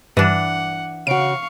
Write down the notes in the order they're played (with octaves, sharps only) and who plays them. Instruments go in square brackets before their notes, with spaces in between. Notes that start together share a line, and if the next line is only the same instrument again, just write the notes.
[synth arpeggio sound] G2 [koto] E3 D4 [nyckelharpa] F#5
[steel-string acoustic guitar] C#3 F#4 [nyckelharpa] F5 C#6 [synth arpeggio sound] D7